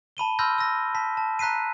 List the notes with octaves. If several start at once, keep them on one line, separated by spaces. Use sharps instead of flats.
A5 B5 D#7 G7
B5 C6 E6 F6 G6 A#6
E6 A#6
A5 B6
A5
A#5 F#6 B6 C7 D#7